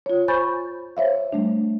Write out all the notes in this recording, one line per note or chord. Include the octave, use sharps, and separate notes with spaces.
F4 C#5
C5 G#5 B5 C#6 G6 A6
C5 C#5 E5 F5
G3 A3 D4